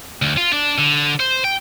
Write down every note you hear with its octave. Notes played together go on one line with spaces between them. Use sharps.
D2
F4
D4
D3
C5
G5